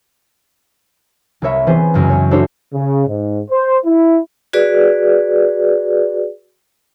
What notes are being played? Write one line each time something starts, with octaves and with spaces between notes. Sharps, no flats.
C2 C4 A#4 C#5 E5 B5
E3 B3 C4 G#4 B4 C5
C2 F#2 C#3 G#3
C#5
D4 E4 F#4 A4 C5 C#5
C#3
G#2
C5
E4
F#4 G#4 B4 D5